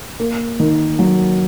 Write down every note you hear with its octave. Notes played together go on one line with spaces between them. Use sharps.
A#3
D#3
F#3